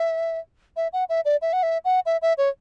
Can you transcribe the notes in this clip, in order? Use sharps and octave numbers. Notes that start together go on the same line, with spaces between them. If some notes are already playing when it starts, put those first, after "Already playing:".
Already playing: E5
E5
F#5
E5
D5
E5
F#5
E5
F#5
E5
E5
C#5